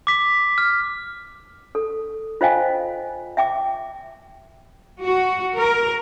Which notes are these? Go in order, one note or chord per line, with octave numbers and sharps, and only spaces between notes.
D6 B6
F6
A4
F4 C5 D#5 F5 G5 G#5
E5 G5 D6
F#4
A#4